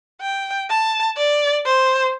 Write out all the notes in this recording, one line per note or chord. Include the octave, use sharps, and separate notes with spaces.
G5
A5
D5
C5